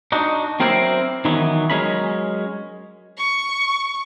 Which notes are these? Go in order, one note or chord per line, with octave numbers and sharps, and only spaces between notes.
D4 D#4 F#4
F#3 C4 E4 A#4 C5 D5
D#3 E3 F#3 B3
F#3 G#3 C#4 A#4 B5
C#6